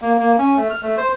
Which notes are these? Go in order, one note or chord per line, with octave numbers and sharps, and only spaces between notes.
A#3
A#3
C#4
A3
F6
A3
C5